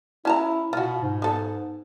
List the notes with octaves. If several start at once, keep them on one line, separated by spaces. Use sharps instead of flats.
C#4 E4 A5 A#5
B2 F4 F#4
G#2
B3 A4